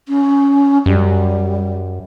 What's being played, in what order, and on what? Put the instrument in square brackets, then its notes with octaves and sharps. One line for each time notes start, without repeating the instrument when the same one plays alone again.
[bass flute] C#4
[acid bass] F#2 [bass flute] G3